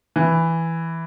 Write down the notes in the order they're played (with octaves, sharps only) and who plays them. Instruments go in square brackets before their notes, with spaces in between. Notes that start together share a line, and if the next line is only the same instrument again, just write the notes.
[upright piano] E3